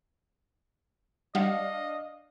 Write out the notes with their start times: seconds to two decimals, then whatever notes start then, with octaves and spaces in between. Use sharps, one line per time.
1.35 G3 D4 D#5 F5 C#7